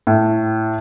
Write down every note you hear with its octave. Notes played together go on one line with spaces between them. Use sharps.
A2